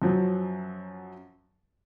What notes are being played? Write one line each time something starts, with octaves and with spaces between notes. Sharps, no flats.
F#2 F3 F#3